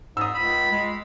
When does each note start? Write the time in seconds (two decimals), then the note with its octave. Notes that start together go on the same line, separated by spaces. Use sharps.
0.17 G#2 D#6 E6
0.35 C#2 B5
0.72 G#3